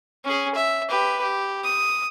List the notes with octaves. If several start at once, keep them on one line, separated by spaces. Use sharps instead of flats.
C#4 G#4
E5
G4 B4
G4
D#6